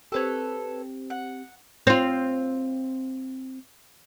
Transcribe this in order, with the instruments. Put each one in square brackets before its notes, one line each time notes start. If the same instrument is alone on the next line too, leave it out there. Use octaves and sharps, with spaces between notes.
[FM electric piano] C4 G4 [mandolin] A4 B4 C#5
[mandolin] F#5
[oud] C4 F4